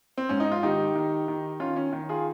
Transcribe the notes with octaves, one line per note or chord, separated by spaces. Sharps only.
C4
G#2 C#4
D#4
F4
D#3 D#4 G4
D#3
D#3
D#3 C#4 F4
C#4
D#3
F4 G#4